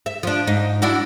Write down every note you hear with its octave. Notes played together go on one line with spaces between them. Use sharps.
E5
F3 D4
G#2 D#4
D4 E4 F#4